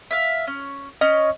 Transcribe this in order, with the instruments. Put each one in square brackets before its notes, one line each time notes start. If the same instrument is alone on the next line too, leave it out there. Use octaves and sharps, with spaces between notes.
[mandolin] E5 F5
C#4
[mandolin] C#4 [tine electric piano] D#5